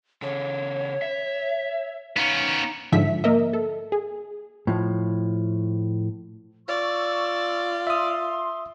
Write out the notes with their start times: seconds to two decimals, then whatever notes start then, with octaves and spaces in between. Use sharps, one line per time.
0.22 C#3 A4 C#5
1.02 E5
2.17 B3 C#4 D#4 F5
2.92 G#2 D3 F3 E5 B6
3.24 A#3 A#4 D#5 E5
3.53 A4
3.92 G#4
4.67 A2 F3
6.68 F4 D5 C#6 E6
7.87 E5 C6 D#6